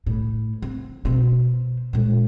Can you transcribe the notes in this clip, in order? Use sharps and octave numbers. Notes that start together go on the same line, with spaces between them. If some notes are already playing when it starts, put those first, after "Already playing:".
A2
C4
B2 C4
A#2 G#3